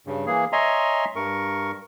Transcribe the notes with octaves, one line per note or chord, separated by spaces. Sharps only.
G2 C#3
E3 A#3 G#4
C#5 D#5 E5 G#5 A#5 C6
G2 A#4 C#6